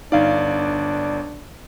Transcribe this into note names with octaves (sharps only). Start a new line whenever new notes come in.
G1 D4 D#4 D5 F5